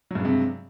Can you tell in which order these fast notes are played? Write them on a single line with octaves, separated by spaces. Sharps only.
F#3 G2 G#3 C3